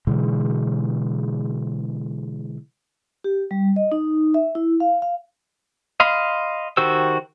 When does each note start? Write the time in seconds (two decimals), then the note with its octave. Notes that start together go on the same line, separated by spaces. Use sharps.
0.07 B2 D3 E3 G#3
3.24 G4
3.51 G3
3.76 D#5
3.92 D#4
4.34 E5
4.55 E4
4.80 F5
5.02 F5
6.00 D#5 F5 B5 C6
6.77 D#3 F#4 G4 C5 E6